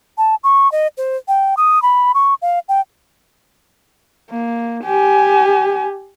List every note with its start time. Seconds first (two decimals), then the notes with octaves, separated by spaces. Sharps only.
0.18 A5
0.44 C#6
0.72 D#5
0.97 C5
1.28 G5
1.57 D#6
1.82 B5
2.14 C#6
2.42 F5
2.69 G5
4.31 A#3
4.83 G4 G#5